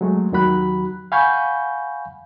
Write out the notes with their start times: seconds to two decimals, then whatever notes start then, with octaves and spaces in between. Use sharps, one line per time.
0.01 F#3 G#3 A3
0.32 D#2 D#3 F#3 F#4 B5 F#6
1.12 F5 F#5 G#5 B5 C#6 G6